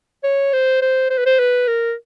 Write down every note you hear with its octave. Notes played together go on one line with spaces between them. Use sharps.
C#5
C5
C5
C5
B4
C5
B4
A#4